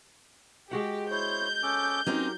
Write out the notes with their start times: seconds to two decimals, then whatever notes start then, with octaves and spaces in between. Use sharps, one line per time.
0.71 G#3 F#4 G4 F#5
1.11 E4 C5 C#5 G6
1.63 C#4 A4 D6
2.06 F#3 C4 C#4 D#4 G4 A#4